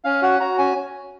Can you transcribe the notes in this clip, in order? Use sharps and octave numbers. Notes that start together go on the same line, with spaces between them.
C#4 F5
F#4 F#5
F#4 A#5
C#4 G#5